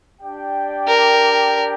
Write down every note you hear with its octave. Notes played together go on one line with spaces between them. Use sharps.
D4 G4 D5 G5
A#4